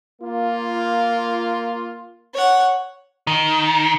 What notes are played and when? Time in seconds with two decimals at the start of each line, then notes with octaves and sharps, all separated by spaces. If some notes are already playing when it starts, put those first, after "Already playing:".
0.22 A#3 F4
2.34 C#5 F#5
3.27 D#3